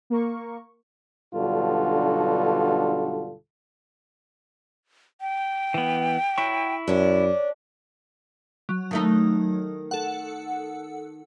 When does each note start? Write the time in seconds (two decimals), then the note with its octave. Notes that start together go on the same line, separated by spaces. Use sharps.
0.10 A#3 A#4 C#6
1.34 B1 G2 D3 F4 F#4 A4
5.21 G5
5.74 E3 B3
6.38 F#3 E4 C#6
6.88 F#2 C#4 D4
8.69 F#3
8.91 D#3 A3 D#4
9.91 A4 F#5